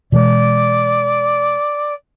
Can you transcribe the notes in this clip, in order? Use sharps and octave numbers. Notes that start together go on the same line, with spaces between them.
B2 E3 G#3 D5